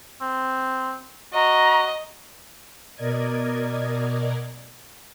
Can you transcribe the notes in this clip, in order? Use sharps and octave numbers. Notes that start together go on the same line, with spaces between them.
C4
F#4 D#5 A#5
B2 A#4 D5 D#5 G#6